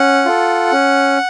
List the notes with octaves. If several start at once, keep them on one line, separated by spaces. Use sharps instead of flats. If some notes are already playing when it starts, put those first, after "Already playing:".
Already playing: C#4 F#5
F4 A4
C#4